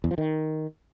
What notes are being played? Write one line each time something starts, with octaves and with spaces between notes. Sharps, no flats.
E2
F3
D#3